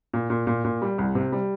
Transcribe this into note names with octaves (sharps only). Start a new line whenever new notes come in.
A#2
A#2
A#2
A#2
G3
C2
C3
G3